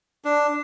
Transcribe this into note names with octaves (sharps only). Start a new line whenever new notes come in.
D4